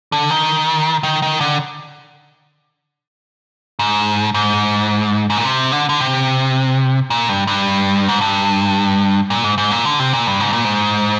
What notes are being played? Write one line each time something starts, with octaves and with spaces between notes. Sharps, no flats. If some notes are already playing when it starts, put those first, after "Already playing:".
D3
D#3
D#3
D#3
D3
G#2
G#2
G#2
A#2
C3
D3
D3
C3
A#2
G2
G2
G#2
G2
A#2
G#2
G#2
A#2
D3
C3
A#2
G2
G#2
A#2
G#2